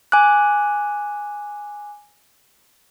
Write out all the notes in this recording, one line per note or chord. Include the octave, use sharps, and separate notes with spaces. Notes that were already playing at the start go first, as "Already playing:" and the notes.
G#5 D6 F#6